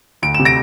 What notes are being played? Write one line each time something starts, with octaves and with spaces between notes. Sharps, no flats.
D2 D7
C3 E7
A#6 D7